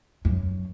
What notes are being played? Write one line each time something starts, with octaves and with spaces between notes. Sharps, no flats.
F#2